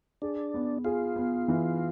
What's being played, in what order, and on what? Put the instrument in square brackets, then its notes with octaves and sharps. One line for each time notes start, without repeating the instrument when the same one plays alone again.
[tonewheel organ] D4 [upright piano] G#4
[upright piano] B3
[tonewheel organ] F4 [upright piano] G#4
[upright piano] B3
E3